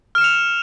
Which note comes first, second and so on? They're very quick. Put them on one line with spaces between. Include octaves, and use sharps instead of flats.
F6 E7 C#7 F7